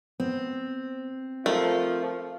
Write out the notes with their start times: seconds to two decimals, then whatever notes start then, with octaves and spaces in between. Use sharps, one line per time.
0.20 B3 C4
1.46 F3 A3 A#4